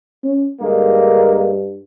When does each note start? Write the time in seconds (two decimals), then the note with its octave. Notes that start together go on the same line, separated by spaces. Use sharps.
0.24 C#4
0.61 G2 D3 G#3 A#3